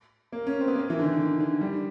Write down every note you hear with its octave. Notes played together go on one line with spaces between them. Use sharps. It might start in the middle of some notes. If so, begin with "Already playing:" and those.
A#3
C#4
C4
B3
A#3
E3
D3
D#3
D3
D3
G3